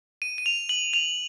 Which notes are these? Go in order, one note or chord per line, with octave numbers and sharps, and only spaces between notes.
D#7
D#7
F7
F#7
F7